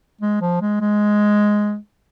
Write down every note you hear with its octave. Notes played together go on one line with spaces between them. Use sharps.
G#3
F3
G#3
G#3